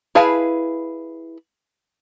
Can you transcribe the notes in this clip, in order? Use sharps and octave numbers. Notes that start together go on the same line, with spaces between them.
E4 G#4 B4 F5 A5